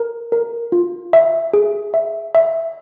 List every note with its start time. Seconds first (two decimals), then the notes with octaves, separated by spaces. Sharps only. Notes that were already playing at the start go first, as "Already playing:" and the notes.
Already playing: A#4
0.32 A#4
0.72 F4
1.13 E5
1.54 G#4
1.94 E5
2.35 E5